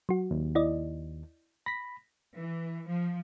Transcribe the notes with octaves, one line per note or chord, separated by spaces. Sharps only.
F#3 F#4
D#2
E4 D5 D#5
B5 A#6 B6
E3
F3